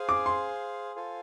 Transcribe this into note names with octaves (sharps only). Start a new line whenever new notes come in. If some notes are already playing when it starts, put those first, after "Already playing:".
Already playing: G#4 C5 F5 G#5
D6
C6
F4 A4 C5 F5 G#5